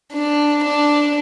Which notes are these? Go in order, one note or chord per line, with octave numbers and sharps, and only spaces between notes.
D4
D4